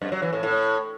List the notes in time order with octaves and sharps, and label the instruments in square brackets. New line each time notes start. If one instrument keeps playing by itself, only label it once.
[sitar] F#2
F#3
E3
A2
A2